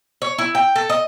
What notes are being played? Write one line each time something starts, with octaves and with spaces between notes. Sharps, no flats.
C#5
E4
G5
A4
D#5